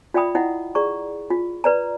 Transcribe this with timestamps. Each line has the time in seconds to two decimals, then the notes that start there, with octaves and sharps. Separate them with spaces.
0.14 F4 D5 E5 G5 B5 D#6
0.35 E4 D#5 F#5
0.75 G#4 D5 A#5 C#6
1.30 F4
1.64 B4 D5 A#5